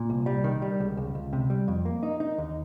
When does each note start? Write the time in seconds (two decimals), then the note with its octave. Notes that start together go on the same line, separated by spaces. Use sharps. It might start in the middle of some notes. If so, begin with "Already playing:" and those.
Already playing: A#2
0.10 C2
0.26 G3
0.44 D#3
0.62 G3
0.80 C#2
0.97 C#2
1.15 C#2
1.33 C3
1.50 G3
1.68 F2
1.85 A#3
2.03 D#4
2.20 D#4
2.38 D#2